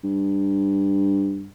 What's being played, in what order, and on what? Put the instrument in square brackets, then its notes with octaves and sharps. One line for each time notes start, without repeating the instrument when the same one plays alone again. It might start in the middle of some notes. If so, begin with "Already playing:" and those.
[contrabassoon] G2